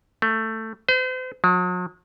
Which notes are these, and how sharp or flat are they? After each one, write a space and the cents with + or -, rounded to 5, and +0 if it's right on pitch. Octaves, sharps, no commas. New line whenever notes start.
A3 +15
C5 -40
F#3 -45